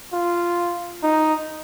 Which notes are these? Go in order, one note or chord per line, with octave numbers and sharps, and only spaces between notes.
F4
D#4